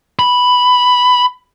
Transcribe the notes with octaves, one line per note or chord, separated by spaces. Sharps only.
B5